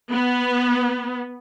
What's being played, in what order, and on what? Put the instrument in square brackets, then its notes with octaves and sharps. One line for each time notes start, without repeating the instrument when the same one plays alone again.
[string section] B3